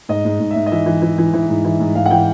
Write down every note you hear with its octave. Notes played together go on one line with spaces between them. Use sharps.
G#2 D#5
G#2
G#2
E5
G#2
D#5
E3 E5
E3
E3
E3
E3
G#2
E3
G#2
G#2 F5
F#5
E3 G5